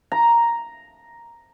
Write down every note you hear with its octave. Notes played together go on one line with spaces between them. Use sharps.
A#5